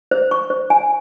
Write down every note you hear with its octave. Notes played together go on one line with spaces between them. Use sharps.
C5
C#6
C5
G#5